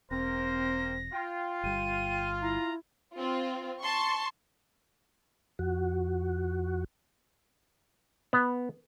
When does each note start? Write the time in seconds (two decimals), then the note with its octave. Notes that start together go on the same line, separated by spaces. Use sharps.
0.11 E1 A#3 C4 A#4 C5 A#6
1.13 F4 G5
1.64 G1 G3 D#7
2.42 E4 A#5
3.14 C4 F4
3.80 A5 C6 C#6
5.59 F2 F#4
8.33 B3